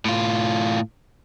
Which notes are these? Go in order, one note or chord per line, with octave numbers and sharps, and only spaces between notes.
A2 F4